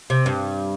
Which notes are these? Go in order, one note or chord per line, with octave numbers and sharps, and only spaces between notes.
C3
G2